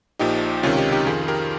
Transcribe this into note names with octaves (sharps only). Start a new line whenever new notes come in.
A#1 A#2 F3 D#4 G4
C#2 C3 D#3 C#4 F4
D#4 G4
D#4 G4
F2 D#3 F4 G#4
G#4
G4 A#4